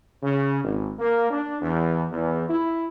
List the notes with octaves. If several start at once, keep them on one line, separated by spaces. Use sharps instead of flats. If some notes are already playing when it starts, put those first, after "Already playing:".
C#3
G#1
A#3
D4
E2
E2
E4